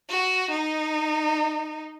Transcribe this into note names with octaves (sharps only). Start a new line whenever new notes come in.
F#4
D#4